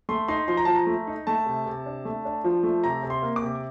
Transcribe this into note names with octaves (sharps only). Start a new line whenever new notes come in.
A3 C6
D#4 C6
F3 C6
A#5
F3 A5
A#5
A3
D#4
A3 A5
C3
C3
D4
A3
D4
F3
A3
C3 A#5
C3
C6
A#3
D6
C3